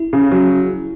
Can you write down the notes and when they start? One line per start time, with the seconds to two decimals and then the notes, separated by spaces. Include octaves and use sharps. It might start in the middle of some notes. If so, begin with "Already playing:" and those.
Already playing: E4
0.13 C#3
0.32 F#3